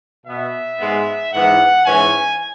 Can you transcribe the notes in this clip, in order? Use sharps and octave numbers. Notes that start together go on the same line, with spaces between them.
B2 B3 E5
G#2 G#3 B3
G#2 E3 B3 F#5
G#2 E3 C#4 G#5